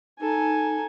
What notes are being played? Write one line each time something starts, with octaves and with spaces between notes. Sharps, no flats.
D#4 A4 G#5